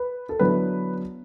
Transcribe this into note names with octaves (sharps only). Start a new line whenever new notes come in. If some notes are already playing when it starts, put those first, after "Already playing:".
Already playing: B4
A4
D3 F#3 B3 E4 B4